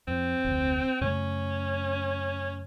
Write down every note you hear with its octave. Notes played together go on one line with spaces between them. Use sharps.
F2 C4
F1 D2
F#2 C#3 A3 C#4